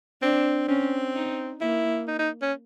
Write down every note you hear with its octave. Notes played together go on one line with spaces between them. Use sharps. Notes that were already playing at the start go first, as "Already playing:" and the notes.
C4 D4
C4 C#4
D#4
A#3 E4
D#4
D#4
C#4